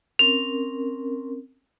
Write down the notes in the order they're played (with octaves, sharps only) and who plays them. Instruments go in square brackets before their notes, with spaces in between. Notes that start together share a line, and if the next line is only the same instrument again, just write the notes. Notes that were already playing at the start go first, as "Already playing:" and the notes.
[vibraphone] C4 C#4 A#4 [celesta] F7